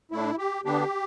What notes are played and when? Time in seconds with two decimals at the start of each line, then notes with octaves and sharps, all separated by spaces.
0.11 A2 A3 D4 E4
0.38 G4
0.65 D3 B3 D4 G4